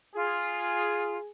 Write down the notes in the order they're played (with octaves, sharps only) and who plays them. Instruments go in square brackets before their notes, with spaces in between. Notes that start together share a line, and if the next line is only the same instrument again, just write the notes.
[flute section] F4 [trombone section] G#4